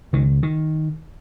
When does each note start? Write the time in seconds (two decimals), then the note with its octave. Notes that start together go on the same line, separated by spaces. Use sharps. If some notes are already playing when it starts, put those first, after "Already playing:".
0.13 C#2 D#3
0.43 D#3